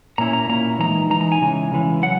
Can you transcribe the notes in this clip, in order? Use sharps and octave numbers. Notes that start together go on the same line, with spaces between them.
A#2 A#3 C#4 E4 A#5
A#5
A#2 A#3 C#4 E4 A#5
E3 G#3 D#4 A#5
E3 G#3 D#4 A#5
A#5
G#5
C#3 E3 G#3
C#3 E3 G#3
F#3 F#5